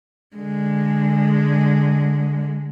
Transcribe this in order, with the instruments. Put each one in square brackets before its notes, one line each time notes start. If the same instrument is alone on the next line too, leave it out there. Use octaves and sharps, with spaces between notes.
[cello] D3 G#3